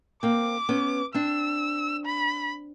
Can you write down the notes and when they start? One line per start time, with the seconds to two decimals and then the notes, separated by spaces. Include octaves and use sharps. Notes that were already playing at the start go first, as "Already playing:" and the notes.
0.23 A#3 C4 D6
0.69 B3 C#4
1.14 C4 D4 E6
2.06 B5